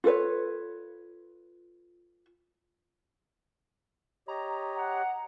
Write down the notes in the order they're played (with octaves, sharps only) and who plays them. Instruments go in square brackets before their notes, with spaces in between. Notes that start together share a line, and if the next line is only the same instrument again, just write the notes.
[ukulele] F4 A4 B4 C#5
[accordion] G4 C#5 D#5 [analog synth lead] A#5
[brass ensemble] F#5